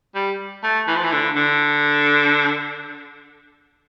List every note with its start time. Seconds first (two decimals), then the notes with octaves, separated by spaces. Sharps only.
0.15 G3
0.63 A3
0.87 E3
0.96 F3
1.03 E3
1.12 D3
1.36 D3